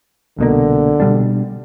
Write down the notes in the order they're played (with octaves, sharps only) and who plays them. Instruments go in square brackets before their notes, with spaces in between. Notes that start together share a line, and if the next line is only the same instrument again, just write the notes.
[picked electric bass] C2 B2 A#3 [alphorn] D3
[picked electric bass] B2 G3 D4